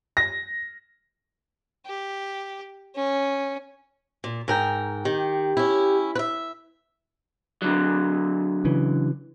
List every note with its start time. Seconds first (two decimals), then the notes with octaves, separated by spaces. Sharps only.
0.17 A#6
1.86 G4
2.95 C#4
4.24 A#2
4.48 G#2 A#4 G5
5.05 D#3 G4
5.57 C#4 E4
6.15 B4 E5
7.62 D3 F#3
8.65 C#3 E3